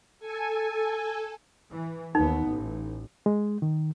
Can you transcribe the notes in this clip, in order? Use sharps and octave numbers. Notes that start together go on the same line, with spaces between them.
A4 G#5
E3
D#2 B3 D#4
A1
G#3
D#3